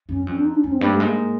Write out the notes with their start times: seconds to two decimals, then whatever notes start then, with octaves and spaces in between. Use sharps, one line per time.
0.09 F#2 C#4
0.27 F2 C#4
0.36 D4
0.45 D#4
0.55 D4
0.63 F2 C#4
0.72 C4
0.81 G2 A#3
0.90 A3
0.99 G#2 A#3